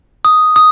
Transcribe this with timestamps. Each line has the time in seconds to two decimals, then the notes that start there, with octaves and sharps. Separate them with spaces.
0.25 D#6
0.56 D#6